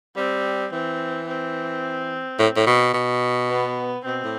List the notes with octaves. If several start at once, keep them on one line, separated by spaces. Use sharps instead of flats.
G3 C4
E3 C4
C4
A2
A2
B2
B2
B3
B2 C4
A2